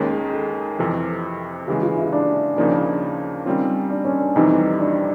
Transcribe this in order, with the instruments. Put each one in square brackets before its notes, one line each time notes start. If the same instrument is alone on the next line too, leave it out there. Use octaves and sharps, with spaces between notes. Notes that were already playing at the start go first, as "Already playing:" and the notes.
Already playing: [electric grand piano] D#2 D#3 G#3 C#4
[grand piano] G#4
A4
[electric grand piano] F2 C3 E3 [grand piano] A4
[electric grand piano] C#3 E3 G#3 [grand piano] G4
[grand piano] F4
E4
D4
[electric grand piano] D#2 C#3 F3 A#3 D#4 [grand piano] D4
[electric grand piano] D#3 G3 C4 F4 [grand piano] C#4
[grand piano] D4
C#4
D4
[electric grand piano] F2 C3 E3 G3 [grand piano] D#4
[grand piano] D4